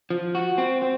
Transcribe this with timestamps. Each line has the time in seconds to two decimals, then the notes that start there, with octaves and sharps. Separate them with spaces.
0.10 F3
0.35 F#4
0.58 C4
0.82 C4